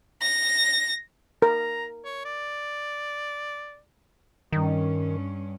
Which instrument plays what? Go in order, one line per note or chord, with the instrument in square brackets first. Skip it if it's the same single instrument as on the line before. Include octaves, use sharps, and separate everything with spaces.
[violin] A#6
[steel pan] A#4 [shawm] A#5
[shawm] C#5
D5
[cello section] G2 C#4 [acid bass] D#3